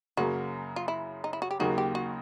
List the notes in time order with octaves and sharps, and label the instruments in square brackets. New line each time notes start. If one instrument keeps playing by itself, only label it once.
[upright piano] F#2 C#3 F#3 A#3 [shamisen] F#4
[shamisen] F4
E4
D#4
E4
F#4
G4
[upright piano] D#2 C#3 F#3 A#3 D#4 [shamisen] F#4
[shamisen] G4
F#4